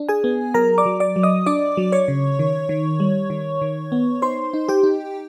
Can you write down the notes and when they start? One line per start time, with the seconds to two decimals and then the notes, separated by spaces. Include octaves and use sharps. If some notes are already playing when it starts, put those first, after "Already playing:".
Already playing: D4
0.09 G#4 G#5
0.24 B3
0.54 F#3 A#4 A#5
0.78 D5 D6
0.86 F#3
1.00 D5 D6
1.16 F#3
1.23 D#5 D#6
1.46 D4 D5 D6
1.77 F#3
1.92 C#5 C#6
2.08 C#3
2.39 D#3
2.69 D#3
3.00 G3
3.30 D#3
3.62 D#3
3.92 B3
4.22 D#4 C5 C6
4.54 D#4
4.69 G4 G5
4.83 D#4